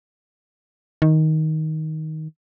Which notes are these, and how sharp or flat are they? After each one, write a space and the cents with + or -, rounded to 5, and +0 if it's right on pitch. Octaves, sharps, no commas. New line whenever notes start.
D#3 +10